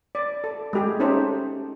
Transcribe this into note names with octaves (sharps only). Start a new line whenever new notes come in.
D5
A4
G#3 A3 G4 G#4
C#4 D#4 G4 A4 C5 E5